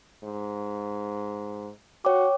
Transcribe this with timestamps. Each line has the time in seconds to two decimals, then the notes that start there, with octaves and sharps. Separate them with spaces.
0.24 G#2
2.05 F#4 C#5 G5 D6